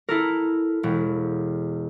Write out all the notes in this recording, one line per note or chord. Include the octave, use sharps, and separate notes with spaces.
E4 A4 A#4
E1